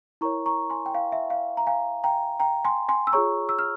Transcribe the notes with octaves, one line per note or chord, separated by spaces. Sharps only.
E4 A#4 C#5 A#5 C#6
A#5 C#6
G#5 C6
G5
F5
E5
F5
A#5
F5 G#5
G5 A#5
G5 A#5
G#5 C6
G#5 C6
E6
F4 G#4 C#5 A#5 C#6
E6
F6